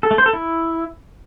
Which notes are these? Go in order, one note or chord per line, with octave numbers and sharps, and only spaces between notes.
A4
A3
C5
A4
E4